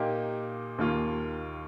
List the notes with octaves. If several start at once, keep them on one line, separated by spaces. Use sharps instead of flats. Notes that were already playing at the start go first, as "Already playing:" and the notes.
Already playing: A#2 A#3 D#4 G4
D#2 D#3 A#3 F4